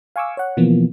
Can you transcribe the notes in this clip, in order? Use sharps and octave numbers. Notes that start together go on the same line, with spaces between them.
F5 G#5 C#6 D6 E6
C#5 F#5
B2 E3 F3 A#3 B3